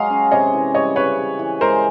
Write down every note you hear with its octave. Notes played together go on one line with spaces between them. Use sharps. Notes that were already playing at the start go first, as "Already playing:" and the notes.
Already playing: F#3 G#3 D#5 F5
C#4
C3 C#5 D#5
E3
G3 C#5 D#5
C#3 B4 C#5
C#3
E3
G#3 A#4 C5